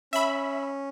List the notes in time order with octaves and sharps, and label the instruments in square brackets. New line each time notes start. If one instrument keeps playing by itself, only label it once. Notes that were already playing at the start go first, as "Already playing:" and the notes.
[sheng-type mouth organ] C#4 [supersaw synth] E5 B5